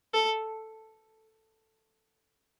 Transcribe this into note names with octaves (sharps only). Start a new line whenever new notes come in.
A4